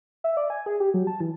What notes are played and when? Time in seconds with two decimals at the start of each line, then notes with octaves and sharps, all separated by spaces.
0.24 E5
0.37 D5
0.50 G#5
0.66 G#4
0.80 G4
0.94 F#3
1.07 A5
1.20 E3